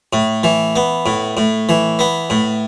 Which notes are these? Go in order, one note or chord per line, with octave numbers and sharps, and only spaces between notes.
A2
E3
B3
A2
A2
E3
B3
A2